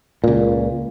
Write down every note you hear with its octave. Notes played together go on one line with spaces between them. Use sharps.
C#2 A#2